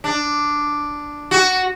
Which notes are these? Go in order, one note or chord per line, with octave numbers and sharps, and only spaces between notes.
D4
F#4